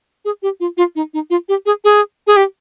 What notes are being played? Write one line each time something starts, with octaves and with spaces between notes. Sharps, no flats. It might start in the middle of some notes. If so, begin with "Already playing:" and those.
G#4
G4
F4
F4
D#4
D#4
F4
G4
G#4
G#4
G#4
G4